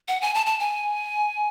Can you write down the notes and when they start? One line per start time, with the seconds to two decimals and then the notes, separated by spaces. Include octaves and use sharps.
0.08 F#5
0.21 G#5
0.35 A5
0.46 A5
0.60 G#5